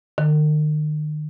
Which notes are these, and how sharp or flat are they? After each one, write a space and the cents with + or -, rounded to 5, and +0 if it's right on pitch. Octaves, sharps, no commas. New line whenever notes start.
D#3 -40